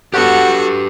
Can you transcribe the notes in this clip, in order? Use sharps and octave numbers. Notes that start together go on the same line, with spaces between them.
B3 F#4 G4 A4 B4 C#5 F#5